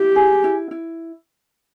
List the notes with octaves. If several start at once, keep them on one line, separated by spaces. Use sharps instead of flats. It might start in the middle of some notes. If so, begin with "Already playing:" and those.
Already playing: E4 G4
G#4
E4
E4